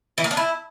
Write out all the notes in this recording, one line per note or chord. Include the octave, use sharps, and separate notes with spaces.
E3
A#3
D4
E4